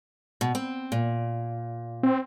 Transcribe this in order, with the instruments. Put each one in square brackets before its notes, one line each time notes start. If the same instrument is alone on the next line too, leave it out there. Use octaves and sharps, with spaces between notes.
[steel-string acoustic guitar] B2
C4
A#2
[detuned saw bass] C4